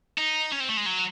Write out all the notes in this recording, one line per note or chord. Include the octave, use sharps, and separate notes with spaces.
D#4
C#4
C4
A3
G#3
F#3